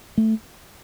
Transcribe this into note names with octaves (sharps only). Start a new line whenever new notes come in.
A3